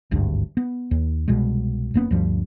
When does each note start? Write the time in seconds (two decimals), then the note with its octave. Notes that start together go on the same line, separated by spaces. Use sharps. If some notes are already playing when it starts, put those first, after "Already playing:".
0.11 G#1 D2 G2
0.57 B3
0.91 D#2
1.28 C2 B2 G3 G#3
1.94 F#1 A#3 B3 C#4
2.11 D2 G2 F3 G3